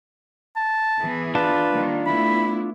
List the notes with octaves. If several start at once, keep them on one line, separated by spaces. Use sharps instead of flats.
A5
E3 B3 G#4
D4 F4 B4 A5
D#3 G3 A#3
A3 B3 E4 B5